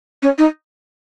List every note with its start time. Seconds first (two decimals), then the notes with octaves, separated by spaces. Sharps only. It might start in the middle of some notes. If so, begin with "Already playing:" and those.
0.22 C#4
0.38 D#4